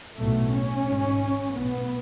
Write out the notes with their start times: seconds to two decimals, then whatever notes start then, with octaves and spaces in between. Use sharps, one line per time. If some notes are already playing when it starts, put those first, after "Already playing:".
0.18 B1 A2 A3
0.52 C#4
0.85 G#1 G#2
1.53 B1 A2 B3